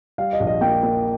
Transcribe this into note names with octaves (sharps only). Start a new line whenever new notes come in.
G3 F5
D#5
A#1
D#5
A#3 G5
A#3